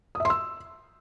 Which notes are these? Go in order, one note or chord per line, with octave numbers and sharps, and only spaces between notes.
D#6
E5
C6
E6